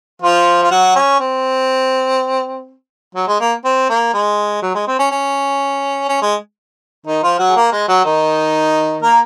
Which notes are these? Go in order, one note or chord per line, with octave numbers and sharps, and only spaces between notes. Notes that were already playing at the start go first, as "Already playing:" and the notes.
F3 F4
F4
F#3 F#4
C#4
C4
F#3
G#3
A#3
C4
A#3
G#3
F#3
G#3
C4
C#4
C#4
C#4
G#3
D#3 D#4
F3 F4
F#3 F#4
G#4
A#3 A#4
G#3 G#4
F#3 F#4
D#3 D#4
A#3 A#4